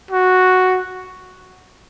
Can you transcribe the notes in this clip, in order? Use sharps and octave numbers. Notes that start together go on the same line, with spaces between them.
F#4